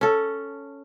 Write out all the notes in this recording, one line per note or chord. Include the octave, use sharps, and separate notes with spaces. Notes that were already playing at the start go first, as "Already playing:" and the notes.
C#4 A4